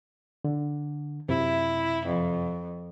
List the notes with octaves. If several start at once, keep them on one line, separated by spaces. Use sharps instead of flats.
D3
F#2 C3 E4
F2